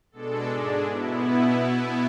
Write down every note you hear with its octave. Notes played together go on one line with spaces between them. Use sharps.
B2 G#3 D4 A4
G#2 G#3 D4
B2 B3 E4